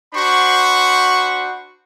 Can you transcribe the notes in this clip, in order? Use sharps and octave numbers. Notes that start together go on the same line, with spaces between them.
D4 F#4 C5 B5 C#6